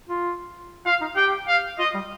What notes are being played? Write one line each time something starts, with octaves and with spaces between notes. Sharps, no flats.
F4
F4 F5
D#4
G4 G5
F5
F4 D#5
G3